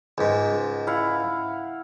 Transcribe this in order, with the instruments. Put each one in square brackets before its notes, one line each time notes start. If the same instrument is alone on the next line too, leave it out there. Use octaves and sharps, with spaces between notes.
[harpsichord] C#2 G#2
[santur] E4 F5 F#5